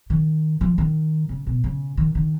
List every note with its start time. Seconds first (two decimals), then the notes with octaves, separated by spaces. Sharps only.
0.10 D#3
0.61 F3
0.78 D#3
1.29 C#3
1.47 B2
1.64 C#3
1.97 D#3
2.15 D#3